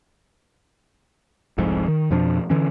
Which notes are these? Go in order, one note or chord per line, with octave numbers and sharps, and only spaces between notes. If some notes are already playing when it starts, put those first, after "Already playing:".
F1 C2 F2 G#2
D#3
F2 B2 F3 D4
D3 E3 C#4